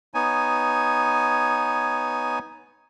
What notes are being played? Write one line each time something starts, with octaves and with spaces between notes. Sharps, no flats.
B3 D#4 C#5 G#5